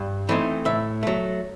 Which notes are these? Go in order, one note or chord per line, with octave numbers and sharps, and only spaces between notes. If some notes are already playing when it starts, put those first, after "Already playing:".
Already playing: G2
E3 A3 C4 D#4
A2 E5
F#3 A3